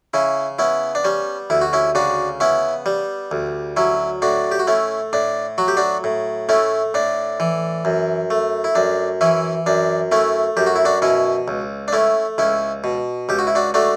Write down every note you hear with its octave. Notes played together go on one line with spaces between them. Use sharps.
C#3 C#4 E4
B3 C#4 E4
D4
G3 C#4
D2 E4
F#4
C#4 E4
C#3 D4 F#4
B3 C#4 E4
G3
D2
F#3 C#4 E4
A2 D4 F#4
G4
F#4
A3 C#4 E4
A2 D4
F#3 F#4
G4
D4 F#4
A2
A3 C#4 E4
A2 D4
E3
F#2
A3
E4
F#2 D4
E3 C#4 E4
F#2 D4
A3 C#4 E4
F#2 G4
F#4
E4
D4 F#4
B2 C#4 E4
C#2
D4
A3 C#4 E4
C#2 C#4 E4
B2
C#2 G4
F#4
E4
D4 F#4
A3 D4 F#4